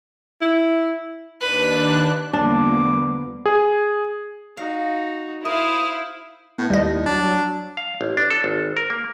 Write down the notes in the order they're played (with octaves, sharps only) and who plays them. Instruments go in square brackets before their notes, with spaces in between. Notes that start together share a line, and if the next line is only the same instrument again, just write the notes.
[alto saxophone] E4
[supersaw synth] D#2 D4 F#6 [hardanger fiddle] B4
[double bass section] E2 D3 B3 [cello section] F3 G3 A#3 [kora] D4 [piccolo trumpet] D6
[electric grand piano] G#4
[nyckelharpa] D#4 F#4 [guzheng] F5
[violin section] E4 [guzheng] A#4 [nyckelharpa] C5 F5 [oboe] D#6
[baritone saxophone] A2 [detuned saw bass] B3
[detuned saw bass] D#2 [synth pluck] G3 D#5
[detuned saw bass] F#3 [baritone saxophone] D4
[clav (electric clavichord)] F5
A1
D4
A4
G#1
A#4
A#3